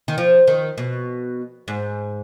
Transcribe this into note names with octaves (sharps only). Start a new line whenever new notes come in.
D#3
F3
D#3
B2
G#2